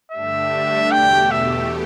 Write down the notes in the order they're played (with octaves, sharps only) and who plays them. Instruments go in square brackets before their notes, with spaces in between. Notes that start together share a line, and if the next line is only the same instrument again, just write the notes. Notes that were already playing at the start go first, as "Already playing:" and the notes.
[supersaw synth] G2 D3 A3 D4 G4 [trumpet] E5
[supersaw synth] E2 B2 A3 G4 [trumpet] G5
[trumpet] E5